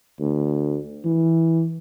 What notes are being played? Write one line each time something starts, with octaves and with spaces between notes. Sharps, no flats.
D2
E3